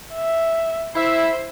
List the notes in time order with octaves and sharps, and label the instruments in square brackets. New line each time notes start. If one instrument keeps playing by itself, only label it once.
[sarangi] E5
[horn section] E4 E5 [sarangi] C5